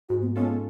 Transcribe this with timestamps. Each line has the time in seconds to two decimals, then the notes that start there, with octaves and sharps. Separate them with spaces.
0.09 G#2 F#4
0.22 B3
0.35 G#3 B3 C#4 F4 A4